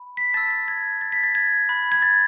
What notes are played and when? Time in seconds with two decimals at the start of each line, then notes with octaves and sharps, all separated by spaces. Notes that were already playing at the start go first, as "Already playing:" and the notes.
Already playing: B5
0.17 B6
0.34 A5 E6 A6
0.51 A6
0.68 G#6
1.01 A6
1.12 B6
1.24 A6
1.35 G#6
1.69 B5 F#6
1.92 G#6
2.02 A6